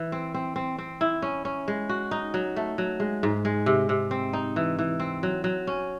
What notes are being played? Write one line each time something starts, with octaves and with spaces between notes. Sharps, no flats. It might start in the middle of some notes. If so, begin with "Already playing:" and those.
Already playing: E3
C4
C4
C4
C4
E4
C#4
C#4
G#3
F#4
D#4
F#3
A3
F#3
G#3
G#2
G#3
C3
C3
C4
D#4
E3
E3
C4
F#3
F#3
C#4